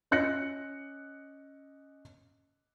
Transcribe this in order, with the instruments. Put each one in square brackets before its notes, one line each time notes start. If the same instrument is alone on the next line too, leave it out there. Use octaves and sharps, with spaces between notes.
[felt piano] C#4 D#5 F#6 A#6 C#7